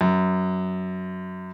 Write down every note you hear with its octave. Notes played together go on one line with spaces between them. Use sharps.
F#2